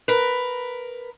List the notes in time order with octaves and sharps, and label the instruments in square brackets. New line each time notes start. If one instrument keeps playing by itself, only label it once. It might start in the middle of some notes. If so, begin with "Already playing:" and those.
[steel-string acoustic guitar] A#4 B4